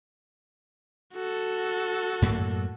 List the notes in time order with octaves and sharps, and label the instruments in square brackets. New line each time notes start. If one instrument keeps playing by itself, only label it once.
[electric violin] F#4 A4
[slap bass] F#2 A2 A#3